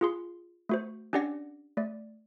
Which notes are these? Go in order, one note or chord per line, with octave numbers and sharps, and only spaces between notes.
F4 G#4 C6
A3 F#4 C5
C#4 D4 G4 D5 F#5 A#6
A3 D5